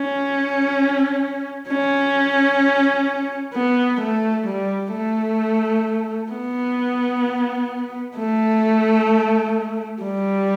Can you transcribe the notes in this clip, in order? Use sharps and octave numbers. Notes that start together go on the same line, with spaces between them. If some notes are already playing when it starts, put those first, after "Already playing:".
Already playing: C#4
C#4
B3
A3
G3
A3
B3
A3
G3